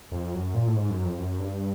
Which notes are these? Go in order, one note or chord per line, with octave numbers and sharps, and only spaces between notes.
F2
F#2
A#2
A2
G#2
F#2
F2
F#2
G2